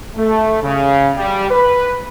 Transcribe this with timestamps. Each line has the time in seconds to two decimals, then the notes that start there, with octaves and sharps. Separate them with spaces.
0.16 A3
0.63 C#3
1.17 G3
1.51 B4